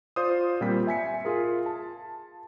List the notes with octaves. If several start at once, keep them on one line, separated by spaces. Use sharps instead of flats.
F4 C5 D5 D#6
A#2 G3 C4 G5 B6
E5 G#5 B6 C#7
F4 G#4 A#4
A5